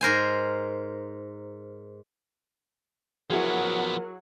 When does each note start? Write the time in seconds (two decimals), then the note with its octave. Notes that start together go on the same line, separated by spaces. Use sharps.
0.01 G#2 A#4 C5 G#5
3.30 F3 F#3 B3 E4 F#4 G#4 A#4